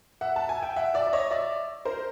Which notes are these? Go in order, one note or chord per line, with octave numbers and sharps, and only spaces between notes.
E5 F#5
A5
G#5
G5
E5 F#5
D5 E5
D5
C#5 D#5
D5 E5
A#4 C5